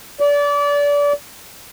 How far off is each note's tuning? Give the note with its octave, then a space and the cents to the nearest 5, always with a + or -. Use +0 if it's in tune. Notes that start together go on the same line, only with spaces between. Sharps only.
D5 -30